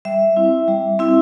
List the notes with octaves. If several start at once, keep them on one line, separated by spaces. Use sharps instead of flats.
G3 E5
C4 E4
G3
C4 E4